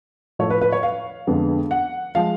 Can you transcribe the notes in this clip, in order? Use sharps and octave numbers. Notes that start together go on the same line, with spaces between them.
A2 F3 A3 C#5
B4
B4
C#5
F5
F2 D3 G#3 B3
F#5
F3 G#3 F5